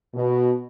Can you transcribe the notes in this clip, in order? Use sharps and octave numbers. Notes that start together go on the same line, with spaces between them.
B2